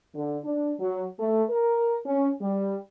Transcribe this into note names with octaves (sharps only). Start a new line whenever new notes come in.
D3
D4
F#3
A3
A#4
C#4
G3